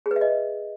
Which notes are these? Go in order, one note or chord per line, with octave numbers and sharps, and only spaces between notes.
G#4
B4
E5
D#5